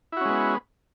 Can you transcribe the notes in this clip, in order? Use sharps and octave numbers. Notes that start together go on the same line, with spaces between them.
G#3 B3 C#4 E4 F#4